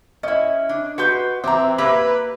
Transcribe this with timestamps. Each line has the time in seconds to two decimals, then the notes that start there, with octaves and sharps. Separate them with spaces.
0.23 C#4 E4 D#5
0.69 D4
0.98 F#4 B4 C6 G6
1.44 E3 C4 E5 A#5 D6
1.78 A#3 G4 B4 E5 A#5 E6